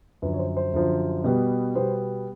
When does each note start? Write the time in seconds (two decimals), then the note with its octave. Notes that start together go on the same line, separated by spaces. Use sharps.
0.22 F#2 D3 F3 B4
0.34 C#5
0.39 C5
0.57 C5
0.73 F#2 D3 F3
1.24 B2 G3 B3
1.76 B2 G3 B3 C5